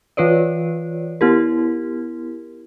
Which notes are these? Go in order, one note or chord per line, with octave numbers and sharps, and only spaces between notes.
E3 F4 B4 C#5 D5
B3 E4 G4 A#4